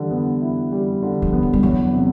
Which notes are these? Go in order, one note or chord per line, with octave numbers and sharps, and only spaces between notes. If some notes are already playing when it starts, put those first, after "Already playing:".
Already playing: D3 E3 G3
B3
E4
G3
D3
F3
B3
F#3
G3
E2 F#3
C3